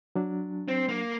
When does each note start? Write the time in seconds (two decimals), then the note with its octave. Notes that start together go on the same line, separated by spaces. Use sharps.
0.15 F#3 D4
0.68 C4
0.89 A#3